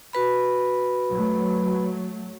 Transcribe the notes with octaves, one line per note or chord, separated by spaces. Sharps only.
F#4 B4 B5
F#3 A3